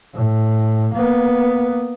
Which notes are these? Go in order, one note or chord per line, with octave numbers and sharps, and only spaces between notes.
A2
A#3 B3